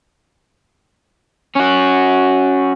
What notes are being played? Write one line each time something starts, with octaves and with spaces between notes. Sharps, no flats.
C#4 F#4